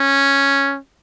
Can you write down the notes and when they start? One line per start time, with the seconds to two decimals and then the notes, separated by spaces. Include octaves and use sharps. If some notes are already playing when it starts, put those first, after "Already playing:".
Already playing: C#4